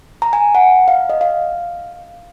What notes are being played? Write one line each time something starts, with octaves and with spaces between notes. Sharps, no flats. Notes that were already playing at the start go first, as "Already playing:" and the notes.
A#5
G#5
F#5
F5
D#5
F5